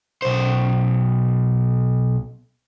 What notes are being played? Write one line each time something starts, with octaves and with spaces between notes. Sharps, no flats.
B1 C5